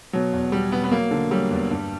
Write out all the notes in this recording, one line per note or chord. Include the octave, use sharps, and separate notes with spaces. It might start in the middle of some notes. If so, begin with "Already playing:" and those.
B2 F#3
E2
B2 G3
B2 B3
B3
F#3 A#3
D3
F#3 G3
E2
G2